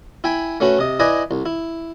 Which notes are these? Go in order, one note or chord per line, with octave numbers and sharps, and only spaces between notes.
E4 G5 G#5 B5
A3 C#4 F#4 B4
C3 D#5
E4 B4 D5 D#5 G#5 A#5
C2
E4